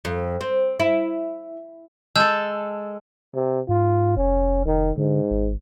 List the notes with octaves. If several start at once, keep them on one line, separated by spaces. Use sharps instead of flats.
F2
C4
E4
G#3 A4 A5 E6 G6
C3
G#2 F4
F1 C#4
F1 D#3
G#2 D3
G#1